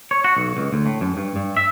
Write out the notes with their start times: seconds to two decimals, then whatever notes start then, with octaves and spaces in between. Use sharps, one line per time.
0.11 C#5
0.24 F#4
0.37 B1
0.57 C#2
0.73 D2
0.86 A2
1.01 F#2
1.17 G2
1.36 G2
1.57 E5